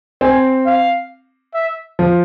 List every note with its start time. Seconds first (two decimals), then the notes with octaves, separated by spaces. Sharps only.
0.21 C4 G#5
0.66 F5
1.54 E5
1.99 F3